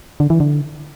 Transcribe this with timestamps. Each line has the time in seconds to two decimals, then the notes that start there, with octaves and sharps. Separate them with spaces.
0.20 D3
0.30 E3
0.40 D3